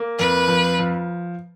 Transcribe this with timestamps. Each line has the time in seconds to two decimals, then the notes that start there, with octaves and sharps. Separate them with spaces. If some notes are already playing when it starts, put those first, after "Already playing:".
Already playing: A#3
0.19 F2 B4
0.48 F3
0.79 F3